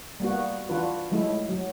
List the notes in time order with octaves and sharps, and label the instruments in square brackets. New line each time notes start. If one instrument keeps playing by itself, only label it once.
[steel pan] G3 A#3 B3 F#4
E3 D4 F4 F#4 B4
F#3 G#3 A3 E4
F#3